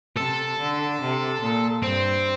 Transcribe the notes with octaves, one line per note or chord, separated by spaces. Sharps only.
C3 A4
D3
C3
A#2
G2 C4